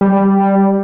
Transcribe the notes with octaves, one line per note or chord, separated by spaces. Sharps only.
G3